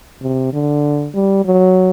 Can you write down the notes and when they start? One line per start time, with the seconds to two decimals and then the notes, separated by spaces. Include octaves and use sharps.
0.22 C3
0.53 D3
1.14 G3
1.45 F#3